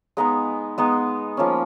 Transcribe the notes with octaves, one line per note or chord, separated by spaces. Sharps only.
G#3 B3 D#4 A#5
G#3 B3 D#4
F3 A#3 C#4